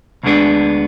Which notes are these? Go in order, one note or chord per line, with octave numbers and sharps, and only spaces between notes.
D2 D3 G#3 B3 D4